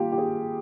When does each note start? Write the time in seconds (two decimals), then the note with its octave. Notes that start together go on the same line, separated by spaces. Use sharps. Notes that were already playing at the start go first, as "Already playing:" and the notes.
Already playing: D#3 G3 A#3 F4 G4
0.12 G4
0.18 G#4